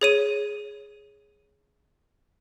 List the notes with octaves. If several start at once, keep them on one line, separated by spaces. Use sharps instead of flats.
G#4 C#5 D#7